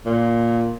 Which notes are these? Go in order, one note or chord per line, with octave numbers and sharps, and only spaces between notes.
A#2